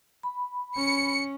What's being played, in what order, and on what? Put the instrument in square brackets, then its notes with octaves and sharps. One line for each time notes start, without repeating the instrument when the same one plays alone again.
[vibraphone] B5
[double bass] C#4 [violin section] C#7